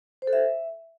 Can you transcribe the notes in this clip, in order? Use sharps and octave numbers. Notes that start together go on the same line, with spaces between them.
C5
A4
E5